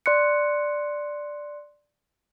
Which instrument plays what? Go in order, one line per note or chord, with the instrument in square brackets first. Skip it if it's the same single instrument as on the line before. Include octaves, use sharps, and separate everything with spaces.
[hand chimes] D5 C6 F#6 C#7